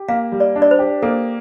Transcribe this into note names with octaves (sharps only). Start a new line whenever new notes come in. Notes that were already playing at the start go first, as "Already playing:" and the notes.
Already playing: G4
A#3 F5
G3
D5
D4
D5
C5
G4
A#3 A4